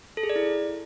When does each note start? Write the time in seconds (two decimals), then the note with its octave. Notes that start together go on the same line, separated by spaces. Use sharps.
0.17 A4
0.23 G#4
0.30 D5
0.36 E4